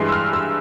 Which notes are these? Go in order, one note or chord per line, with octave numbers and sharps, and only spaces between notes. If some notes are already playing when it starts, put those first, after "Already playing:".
Already playing: G2 E3 G#3 C6
E6
F6
E6